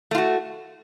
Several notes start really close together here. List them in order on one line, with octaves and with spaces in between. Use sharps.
A3 F4 F#4